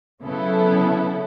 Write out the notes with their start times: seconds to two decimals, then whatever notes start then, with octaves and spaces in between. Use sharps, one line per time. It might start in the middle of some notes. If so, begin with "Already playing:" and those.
0.23 C#3 F#3 B3 E4 A4